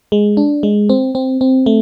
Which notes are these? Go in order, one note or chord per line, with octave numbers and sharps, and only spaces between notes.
G#3
D4
G#3
C4
C4
C4
A3